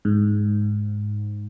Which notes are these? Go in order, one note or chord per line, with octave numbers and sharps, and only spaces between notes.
G#2